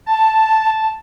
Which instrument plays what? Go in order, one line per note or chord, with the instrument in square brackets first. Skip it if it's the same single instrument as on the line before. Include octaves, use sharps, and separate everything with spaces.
[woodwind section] A5